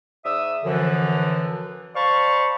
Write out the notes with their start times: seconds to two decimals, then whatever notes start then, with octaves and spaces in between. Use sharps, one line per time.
0.25 G#2 D5 E5 D#6 E6
0.64 F#2 D3 E3 F3
1.95 C5 D5 F5 A5 B5 C#6